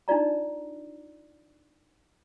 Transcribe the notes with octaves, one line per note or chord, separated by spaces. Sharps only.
D4 D#4 F4 D5 A#5